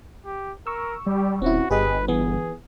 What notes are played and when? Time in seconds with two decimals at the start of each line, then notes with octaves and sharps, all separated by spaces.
0.25 G4
0.67 A#4 C#6 E6
1.06 G3 G4
1.42 D#1 C4 C#4 E4 F#4
1.71 G1 G4 G#4 B4 D#5
2.08 E3 B3 G#4